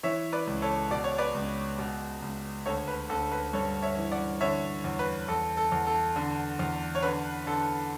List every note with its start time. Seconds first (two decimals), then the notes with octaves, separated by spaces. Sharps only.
0.03 E3 C#5 E5
0.33 B4 D5
0.47 C#2
0.62 A4 C#5
0.91 B2 D5
1.04 C#5
1.18 B4 D5
1.35 C#2
1.79 B2
2.22 C#2
2.66 D2 A4 C#5
2.88 B4
3.10 D2 A4
3.32 B4
3.53 G2 A4 C#5
3.82 C#5 E5
3.97 E3
4.11 D5 F#5
4.41 D3 C#5 E5
4.84 E2
4.99 B4
5.28 E2 A4
5.57 A4
5.72 E2
5.87 A4
6.16 D3
6.59 E2
6.95 C#5
7.03 D3 B4
7.47 D3 A4